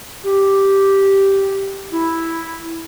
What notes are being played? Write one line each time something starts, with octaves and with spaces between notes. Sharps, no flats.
G4
E4